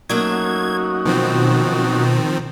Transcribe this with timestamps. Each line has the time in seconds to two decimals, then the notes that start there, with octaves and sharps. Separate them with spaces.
0.10 F#3 A3 A#3 C#4 D#4 F#4 G#6
1.06 B2 D#3 F3 C4